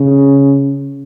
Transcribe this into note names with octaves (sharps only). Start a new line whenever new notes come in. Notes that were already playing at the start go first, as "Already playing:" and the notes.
Already playing: C#3